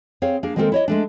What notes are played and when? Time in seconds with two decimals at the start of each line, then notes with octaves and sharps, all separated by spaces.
0.22 C4 G#4 C#5 F5
0.43 A#3 D4 G#4
0.56 D#3 G#3 A#3 C4 A4 A#4
0.72 E4 C#5 D#5
0.88 G#3 A3 D4